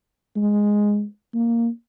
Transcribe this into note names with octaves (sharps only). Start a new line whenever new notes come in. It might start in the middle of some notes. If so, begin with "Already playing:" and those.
G#3
A#3